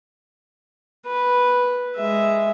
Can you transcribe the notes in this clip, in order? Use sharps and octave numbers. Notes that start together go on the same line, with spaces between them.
B4
G#3 E5